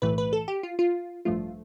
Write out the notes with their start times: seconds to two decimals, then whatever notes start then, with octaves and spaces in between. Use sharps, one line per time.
0.02 B1 A2 E3 A3 B4
0.18 B4
0.33 A4
0.48 G4
0.63 F4
0.79 F4
1.25 A1 G2 F3 A3 F4